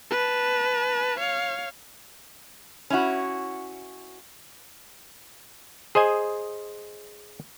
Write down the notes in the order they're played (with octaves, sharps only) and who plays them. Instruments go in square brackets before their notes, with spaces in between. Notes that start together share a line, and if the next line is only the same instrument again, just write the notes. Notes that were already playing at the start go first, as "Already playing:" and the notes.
[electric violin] B4 A5
C#5 F5
[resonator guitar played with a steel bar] C#4 E4 F#4
[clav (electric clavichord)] G#4 C5 D#5 G#5